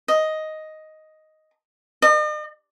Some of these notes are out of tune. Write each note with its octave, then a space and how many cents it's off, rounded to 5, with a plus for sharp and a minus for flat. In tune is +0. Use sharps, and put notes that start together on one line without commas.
D#5 +5
D#5 -45